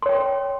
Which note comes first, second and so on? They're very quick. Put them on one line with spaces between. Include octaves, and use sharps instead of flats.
C6 C#5 G5